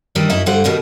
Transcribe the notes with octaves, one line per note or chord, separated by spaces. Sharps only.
D#3 E3 G3 D4
F#2 D#4 E4 E5
G2 D3 G3 C5 F#5
B2 D#3 G3 B3